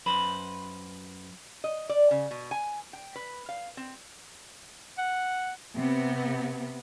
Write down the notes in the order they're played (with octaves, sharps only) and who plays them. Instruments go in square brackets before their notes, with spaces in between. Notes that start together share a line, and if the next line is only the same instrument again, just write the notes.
[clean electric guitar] F#2 B4 C5 B5
[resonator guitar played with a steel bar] D#5
D5
C#3
B2
G#5
G5
B4
F5
C4
[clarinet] F#5
[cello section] C3 B3